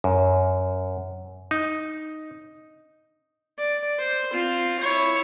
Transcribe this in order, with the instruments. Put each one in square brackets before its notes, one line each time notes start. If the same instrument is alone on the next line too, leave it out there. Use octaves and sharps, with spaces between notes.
[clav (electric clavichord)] F#2
D#4
[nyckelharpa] D5
C5
C4 F4
E4 C#5